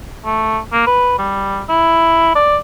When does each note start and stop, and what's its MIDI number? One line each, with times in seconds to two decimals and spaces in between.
0.25 0.59 57
0.72 0.82 58
0.87 1.15 71
1.19 1.62 55
1.69 2.32 64
2.35 2.57 74